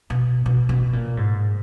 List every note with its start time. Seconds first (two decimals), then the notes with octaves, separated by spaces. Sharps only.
0.10 B2
0.46 B2
0.69 B2
0.93 A#2
1.17 G#2